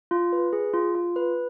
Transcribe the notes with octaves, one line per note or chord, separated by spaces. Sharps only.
F4
B4
G#4
F4
F4
B4